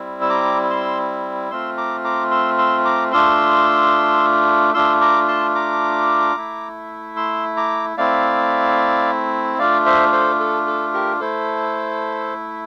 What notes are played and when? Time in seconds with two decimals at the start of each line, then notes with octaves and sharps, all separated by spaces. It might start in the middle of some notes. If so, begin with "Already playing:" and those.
Already playing: G3 C4 E4
0.22 E6
0.30 A#5 D6
0.70 C6 E6
1.51 A3 C4 F4 C6 E6
1.77 A#5 D6
2.04 A#5 D6
2.31 C6 E6
2.58 C6 E6
2.85 A#5 D6
3.12 A3 D4 F4 C6 E6
4.74 A3 D4 F4 C6 E6
5.01 A#5 D6
5.28 A5 C6
5.55 A#5 D6
6.36 A3 E4
7.16 C6 E6
7.57 A#5 D6
7.97 A3 C4 E4 D5 F5
9.58 A3 D4 F4 D5 F5
9.86 C5 E5
10.12 A4 C5
10.40 A4
10.67 A4
10.94 G4 A#4
11.20 A3 E4 A4 C5